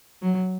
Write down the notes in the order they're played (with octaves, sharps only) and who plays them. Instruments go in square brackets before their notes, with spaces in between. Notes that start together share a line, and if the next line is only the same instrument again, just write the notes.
[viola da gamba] F#3